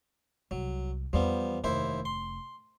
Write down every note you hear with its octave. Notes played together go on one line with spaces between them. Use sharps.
C2 F#3
E2 F3 G3 B3
F1 D#2 E4 C5
C6